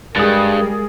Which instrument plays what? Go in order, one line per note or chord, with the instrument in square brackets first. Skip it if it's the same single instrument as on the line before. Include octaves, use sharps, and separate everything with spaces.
[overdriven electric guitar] G2 [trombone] G3 [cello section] G#3 A#4 [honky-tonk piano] G#4 A6